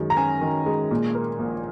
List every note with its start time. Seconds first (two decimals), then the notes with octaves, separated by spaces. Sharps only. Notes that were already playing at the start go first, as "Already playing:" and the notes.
Already playing: F#2 D#3 G#3
0.10 A#5
0.17 C#4 G#5
0.41 D#3
0.66 G#3
0.91 A#2
1.15 A#3
1.39 A#1